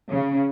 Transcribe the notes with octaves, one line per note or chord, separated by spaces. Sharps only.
C#3